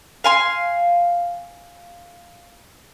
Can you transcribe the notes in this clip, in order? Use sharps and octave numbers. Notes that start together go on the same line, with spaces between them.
F5 G#5 C6